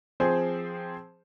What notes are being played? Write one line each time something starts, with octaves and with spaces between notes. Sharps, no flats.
F3 C4 G#4 C5